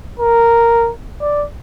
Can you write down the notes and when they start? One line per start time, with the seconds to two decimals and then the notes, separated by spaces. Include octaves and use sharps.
0.20 A#4
1.21 D5